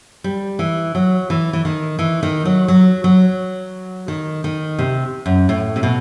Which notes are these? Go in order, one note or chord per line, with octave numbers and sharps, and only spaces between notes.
G3
E3
F#3
E3
E3
D#3
E3
D#3
F#3
F#3
F#3
D#3
D#3
C3
F#2
A2
C3
B2